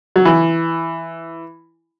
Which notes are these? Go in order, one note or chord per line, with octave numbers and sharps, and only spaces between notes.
F#3
E3